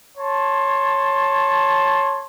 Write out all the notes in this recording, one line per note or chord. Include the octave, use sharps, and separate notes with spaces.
C#5 A5 C6